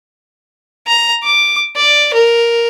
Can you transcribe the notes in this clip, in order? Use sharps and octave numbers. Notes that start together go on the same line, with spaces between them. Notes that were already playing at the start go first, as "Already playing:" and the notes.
A#5
D6
D5
A#4